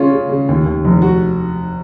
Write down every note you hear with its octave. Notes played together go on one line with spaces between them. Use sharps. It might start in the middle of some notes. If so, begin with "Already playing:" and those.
Already playing: C#3 C#4 F4
C#3
C#3
D#2
D#2
F1
F#4